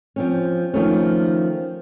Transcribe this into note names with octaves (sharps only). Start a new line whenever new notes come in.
F3 C4 C#4
D#3 F3 A3 C#4